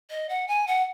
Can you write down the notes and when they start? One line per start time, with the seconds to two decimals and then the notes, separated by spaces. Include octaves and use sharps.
0.10 D#5
0.29 F#5
0.48 G#5
0.67 F#5